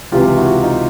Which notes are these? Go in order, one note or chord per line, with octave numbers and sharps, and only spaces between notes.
C#2 C3 E3 F4 G4
E4 F#4
D#4 F4